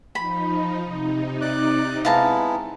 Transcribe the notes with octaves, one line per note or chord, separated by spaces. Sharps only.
F3 D#4 B5
C3 D#4
D5 D6 F#6
G#3 B3 E4 F5 A5 A#5